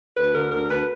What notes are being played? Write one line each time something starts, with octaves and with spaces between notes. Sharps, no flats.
D2 B4
D3 A#4
D2 A#4
D2 B4